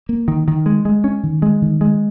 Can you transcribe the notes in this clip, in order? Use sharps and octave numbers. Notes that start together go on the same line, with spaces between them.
A#3
D#3
D#3
G#3
G#3
C#4
D#3
G#3
D#3
G#3